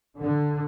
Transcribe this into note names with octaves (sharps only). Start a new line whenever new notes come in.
D3